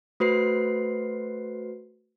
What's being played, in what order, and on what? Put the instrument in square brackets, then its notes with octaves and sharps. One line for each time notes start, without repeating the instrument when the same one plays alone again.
[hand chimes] A3 F#4 B4 C5 C7